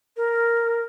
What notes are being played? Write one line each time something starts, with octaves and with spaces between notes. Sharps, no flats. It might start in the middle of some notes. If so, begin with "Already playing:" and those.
A#4